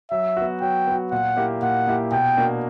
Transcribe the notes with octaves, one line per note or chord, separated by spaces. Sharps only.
F#3 E5
B3 F#4
F#3 G5
B3 F#4
A#2 F#5
A#3 E4 G4
A#2 F#5
A#3 E4 G4
B2 G5
A#3 D4 F#4